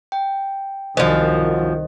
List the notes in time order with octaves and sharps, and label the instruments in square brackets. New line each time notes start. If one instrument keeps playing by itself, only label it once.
[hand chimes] G5
[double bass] C2 D#3 [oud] F#2 F3 [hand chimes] C5 D#5